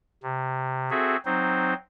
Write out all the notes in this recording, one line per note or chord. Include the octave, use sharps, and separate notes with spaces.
C3
C4 F#4 G#4 A4 E5
F#3 C4 D#4 C5